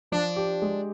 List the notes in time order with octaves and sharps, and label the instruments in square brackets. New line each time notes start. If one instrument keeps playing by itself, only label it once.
[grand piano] F3 [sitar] D4
[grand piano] G4
G#3